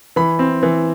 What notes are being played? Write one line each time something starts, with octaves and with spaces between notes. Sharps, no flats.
E3 B5
C4
E3